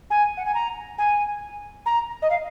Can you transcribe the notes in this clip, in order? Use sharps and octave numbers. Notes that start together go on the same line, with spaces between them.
G#5
F#5
G#5
A#5
G#5
A#5
D#5
F5